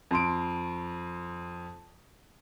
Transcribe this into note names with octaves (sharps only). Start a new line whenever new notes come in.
F2 C6 D7